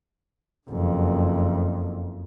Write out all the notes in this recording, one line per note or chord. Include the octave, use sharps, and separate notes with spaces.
F#1 F2